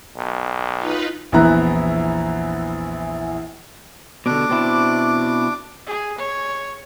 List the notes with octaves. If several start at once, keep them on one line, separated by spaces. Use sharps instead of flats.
B1
D#4 F4 B4
A#1 E2 B3 E4 A#5 F#6
B2 D3 D4 D6
B2 C4 E4
G#4
C#5